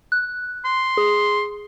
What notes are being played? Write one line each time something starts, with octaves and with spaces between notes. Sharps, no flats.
F#6
C6
G#4